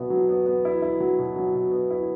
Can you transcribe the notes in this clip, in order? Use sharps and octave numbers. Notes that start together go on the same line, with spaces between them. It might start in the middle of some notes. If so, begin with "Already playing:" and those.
Already playing: B2 F#3 B3 E4
F#3
B3
B3
E4
E4
F#3
B2
F#3
B2
B3
E4